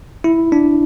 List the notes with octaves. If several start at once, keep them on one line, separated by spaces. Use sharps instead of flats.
E4
D4